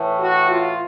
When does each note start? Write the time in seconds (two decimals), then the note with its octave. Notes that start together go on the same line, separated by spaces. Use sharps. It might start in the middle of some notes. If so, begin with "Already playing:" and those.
Already playing: A2 E3
0.21 F#4
0.49 F4